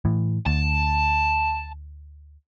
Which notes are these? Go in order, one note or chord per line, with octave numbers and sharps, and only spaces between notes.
A2 E3
D2 A5